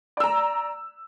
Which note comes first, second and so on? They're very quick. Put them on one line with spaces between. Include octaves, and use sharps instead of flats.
D5 E6 A#5